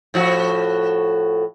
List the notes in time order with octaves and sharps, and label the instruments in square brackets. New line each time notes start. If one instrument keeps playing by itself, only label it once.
[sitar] A2 F3 F#4